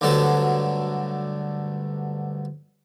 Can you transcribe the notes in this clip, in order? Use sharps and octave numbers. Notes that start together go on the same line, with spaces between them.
D2 G2 D3 F#3 A4